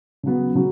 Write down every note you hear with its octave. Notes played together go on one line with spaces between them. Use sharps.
C#3 F#3 B3
C#3 F#3